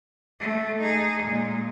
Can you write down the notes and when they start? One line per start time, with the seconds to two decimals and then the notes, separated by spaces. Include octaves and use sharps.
0.40 A3
0.81 D#4 G#4
1.21 A#2 G#3